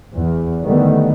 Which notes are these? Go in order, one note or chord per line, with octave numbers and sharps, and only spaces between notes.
E2
D3 D#3 G3 A3 B3